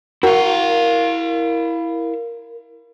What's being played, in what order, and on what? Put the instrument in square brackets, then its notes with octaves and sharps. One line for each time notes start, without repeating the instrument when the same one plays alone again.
[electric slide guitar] E4 F5 [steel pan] F#4 [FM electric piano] A#4